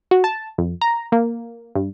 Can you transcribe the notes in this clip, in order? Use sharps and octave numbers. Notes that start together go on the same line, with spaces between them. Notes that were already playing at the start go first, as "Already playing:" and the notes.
F#4
A5
F2
A#5
A#3
G2